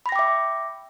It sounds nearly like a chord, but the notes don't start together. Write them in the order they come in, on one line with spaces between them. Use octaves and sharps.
B5 A#6 G5 D6 E5